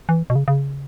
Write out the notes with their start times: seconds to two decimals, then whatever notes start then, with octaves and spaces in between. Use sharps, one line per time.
0.09 E3
0.30 B2
0.35 C#3
0.48 C#3